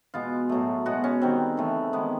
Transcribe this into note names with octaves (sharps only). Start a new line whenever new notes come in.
B2 G#3 B3 F4
A2 F#3 A3
B2 G#3 B3 F#4
C#4
D#3 G3 B3 C4
C#3 E3 A3
D#3 G#3 B3